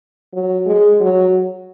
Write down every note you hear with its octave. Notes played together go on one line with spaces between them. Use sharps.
F#3
G#3
F#3